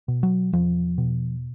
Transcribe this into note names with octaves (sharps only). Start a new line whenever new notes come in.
B2
F#3
E2 F3
B2